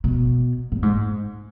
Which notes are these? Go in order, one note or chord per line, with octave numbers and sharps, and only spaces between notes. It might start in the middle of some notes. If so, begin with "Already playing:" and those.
B2
A#2
G#2